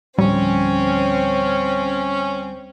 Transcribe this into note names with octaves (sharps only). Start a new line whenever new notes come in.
D2 A2 F3 G3 C4 C#4